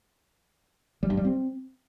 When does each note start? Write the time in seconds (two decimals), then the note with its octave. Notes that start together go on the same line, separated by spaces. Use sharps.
1.03 G3
1.10 G2
1.17 G3
1.25 C4